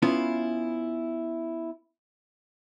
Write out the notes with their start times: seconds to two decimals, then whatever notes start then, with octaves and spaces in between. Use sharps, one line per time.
0.02 B3 C#4 E4 F4